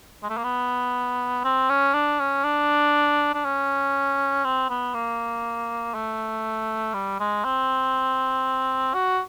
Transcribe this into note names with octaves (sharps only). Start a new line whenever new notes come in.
G#3
A3
A#3
B3
C4
C#4
D4
C#4
D4
D4
C#4
C4
B3
A#3
A3
G3
G#3
C4
F#4